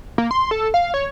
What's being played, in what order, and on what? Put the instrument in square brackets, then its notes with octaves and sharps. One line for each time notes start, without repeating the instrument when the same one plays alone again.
[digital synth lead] A#3
C6
A4
F5
C#5